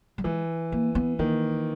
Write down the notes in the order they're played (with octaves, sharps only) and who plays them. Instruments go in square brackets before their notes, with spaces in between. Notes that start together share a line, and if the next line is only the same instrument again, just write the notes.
[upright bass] G3
[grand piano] E3 [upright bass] G#3
[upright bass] A#3
B3
[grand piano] D#3 [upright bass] A#3